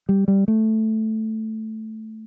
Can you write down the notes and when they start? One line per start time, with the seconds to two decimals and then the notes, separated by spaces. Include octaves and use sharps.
0.09 G3
0.28 G3
0.48 A3